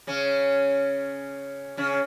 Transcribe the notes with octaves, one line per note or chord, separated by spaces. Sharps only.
C#3 C#4
C#3 C#4